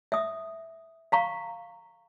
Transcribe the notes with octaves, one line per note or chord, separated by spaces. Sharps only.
E5 D#6
F5 A#5 C#6